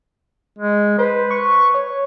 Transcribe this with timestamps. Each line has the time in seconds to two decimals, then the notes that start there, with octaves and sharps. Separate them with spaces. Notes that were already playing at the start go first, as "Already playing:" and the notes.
0.59 G#3
0.98 B4 C5
1.31 C#6
1.74 C#5